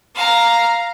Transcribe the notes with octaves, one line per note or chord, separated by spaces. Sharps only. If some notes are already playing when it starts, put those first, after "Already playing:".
F5 A#5